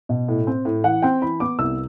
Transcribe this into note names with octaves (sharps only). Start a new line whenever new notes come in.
B2
A2
C4
A2
E3 F#5
C4 G5
E3 B5
B3 D6
C2 E6